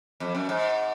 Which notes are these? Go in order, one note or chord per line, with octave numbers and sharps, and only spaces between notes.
F2
F#2
G#2